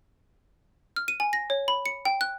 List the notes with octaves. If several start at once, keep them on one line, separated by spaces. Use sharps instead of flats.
F6
D#7
G#5
A#6
C#5
B5
C#7
G5
F#6